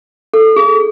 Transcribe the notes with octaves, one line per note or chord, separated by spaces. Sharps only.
A4
G#4